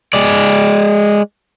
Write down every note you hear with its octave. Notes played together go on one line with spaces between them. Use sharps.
G#3 D5